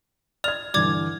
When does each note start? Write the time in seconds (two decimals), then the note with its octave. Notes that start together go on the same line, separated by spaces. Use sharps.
0.44 D5 F6 G#6 F7
0.74 G2 D3 E3 D5 D6 G#6